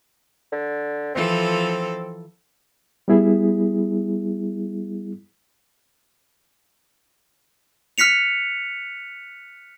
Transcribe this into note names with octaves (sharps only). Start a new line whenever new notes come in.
D3
E3 F3 C4 A4
G3 B3 E4 G#4
F6 F#6 B6 C#7 F7